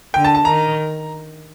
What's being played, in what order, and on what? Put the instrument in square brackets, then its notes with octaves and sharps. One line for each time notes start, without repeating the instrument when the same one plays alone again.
[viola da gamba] D3 [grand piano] G5
[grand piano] A5
A5
[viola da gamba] D#3 [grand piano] A#5